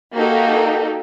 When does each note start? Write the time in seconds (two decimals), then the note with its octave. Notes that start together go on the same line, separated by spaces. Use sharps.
0.15 A#3 D#4 F#4 G4 A4